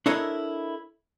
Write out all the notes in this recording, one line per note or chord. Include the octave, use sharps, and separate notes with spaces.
D4 E4 A4 A#4 C#5 D#5